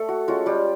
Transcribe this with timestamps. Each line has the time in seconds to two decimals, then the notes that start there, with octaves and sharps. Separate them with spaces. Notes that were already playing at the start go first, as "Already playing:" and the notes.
Already playing: A3 A4
0.09 F#4
0.28 G#3 C#4 F4 F#4
0.46 G3 G4